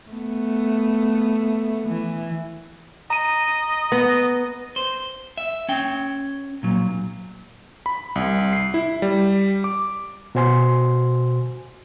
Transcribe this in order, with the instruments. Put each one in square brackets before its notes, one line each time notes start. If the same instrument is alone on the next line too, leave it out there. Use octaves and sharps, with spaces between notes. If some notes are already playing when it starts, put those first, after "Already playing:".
[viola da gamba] A3 B3
E3
[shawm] D#5 [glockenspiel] A#5 D#7
[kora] B3
[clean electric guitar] C5
E5
C#4 G5
A#2 F#3
[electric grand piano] B5
C2
C7
E4
G3
D6
[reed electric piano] B2 F#4 C5 G#5 C6